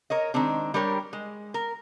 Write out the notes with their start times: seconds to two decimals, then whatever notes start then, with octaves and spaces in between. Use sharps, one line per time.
0.10 A#4 C#5 D#5
0.34 D#3 G#3 C4 D4
0.74 G3 D4 G4 A#4 C#5
1.13 G#3
1.54 A#4